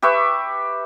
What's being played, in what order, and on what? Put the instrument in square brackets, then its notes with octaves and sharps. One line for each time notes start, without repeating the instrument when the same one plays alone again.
[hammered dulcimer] G4 B4 E5 C#6